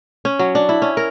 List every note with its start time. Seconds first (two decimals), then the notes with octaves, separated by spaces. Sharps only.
0.25 C#4
0.39 F#3
0.55 D4
0.69 E4
0.82 C#4
0.97 A#4